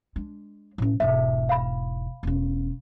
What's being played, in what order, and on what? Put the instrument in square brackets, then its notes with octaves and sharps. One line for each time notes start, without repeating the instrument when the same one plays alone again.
[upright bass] G#3 D4
A2 C#4
[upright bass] E1 G#2 [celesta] E5
[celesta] F5 B5
[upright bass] E1 C#4